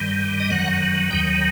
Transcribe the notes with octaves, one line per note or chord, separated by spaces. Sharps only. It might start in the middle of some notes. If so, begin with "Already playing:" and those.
Already playing: G2 D#3 G3
D#5
F#2 D#3 F#3 F#5
D#2 D#3 F#3 G5